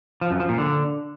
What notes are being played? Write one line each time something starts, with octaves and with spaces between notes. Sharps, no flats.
F3
F#2
F3
A#2
D3